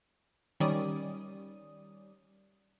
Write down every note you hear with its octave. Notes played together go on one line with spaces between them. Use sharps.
D#3 G3 C#4 D5 D#6